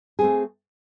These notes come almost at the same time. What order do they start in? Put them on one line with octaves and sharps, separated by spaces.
G#4 C4 A3